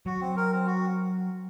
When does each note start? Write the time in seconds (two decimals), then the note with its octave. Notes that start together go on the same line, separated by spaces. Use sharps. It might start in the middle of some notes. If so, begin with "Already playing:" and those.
0.06 F#3 F#4
0.21 C4
0.37 A#4
0.52 C4
0.66 F#4